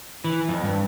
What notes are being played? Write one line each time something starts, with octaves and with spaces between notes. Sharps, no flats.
E3
F2
G2